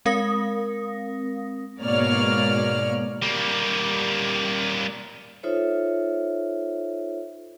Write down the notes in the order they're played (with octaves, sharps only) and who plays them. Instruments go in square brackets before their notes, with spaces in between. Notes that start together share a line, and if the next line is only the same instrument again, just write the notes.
[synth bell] G#3 C4 A#4 F5 D#6 A#6
[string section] G#2 B2 A#3 C#5 D5 F6
[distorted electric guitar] G3 A#3
[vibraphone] D#4 F4 A4 C5 C#5 E5